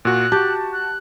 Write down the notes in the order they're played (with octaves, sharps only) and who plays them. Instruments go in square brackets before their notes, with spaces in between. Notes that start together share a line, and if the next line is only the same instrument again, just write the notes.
[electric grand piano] A#2 F#4 [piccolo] F#6
[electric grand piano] F#4 A5 [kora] G4
[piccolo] F#6